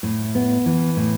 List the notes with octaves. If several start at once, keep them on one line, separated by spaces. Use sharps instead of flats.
A2
B3
E3
A2